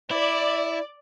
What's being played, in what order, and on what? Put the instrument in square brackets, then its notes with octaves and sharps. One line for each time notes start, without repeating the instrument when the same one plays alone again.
[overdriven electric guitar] E4 [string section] D5